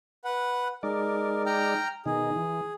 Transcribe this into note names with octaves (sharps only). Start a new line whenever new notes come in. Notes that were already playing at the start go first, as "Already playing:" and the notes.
B4 F#5
G#3 D#4 A#4 D5
G5 A#5 F6
B2 D#3 D#4 G#4
E3